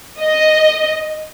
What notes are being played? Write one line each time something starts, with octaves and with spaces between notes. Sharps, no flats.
D#5